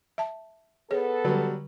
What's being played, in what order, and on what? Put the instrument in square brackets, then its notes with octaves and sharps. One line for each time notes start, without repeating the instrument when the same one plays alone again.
[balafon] E5 A5
[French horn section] B3 A4 B4 [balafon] G#4 C#5
[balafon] D3 [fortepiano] F#3 G3